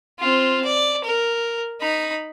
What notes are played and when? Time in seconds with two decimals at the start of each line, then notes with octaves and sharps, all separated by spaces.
0.19 C4 F4
0.65 D5
1.04 A#4
1.81 D#4 B5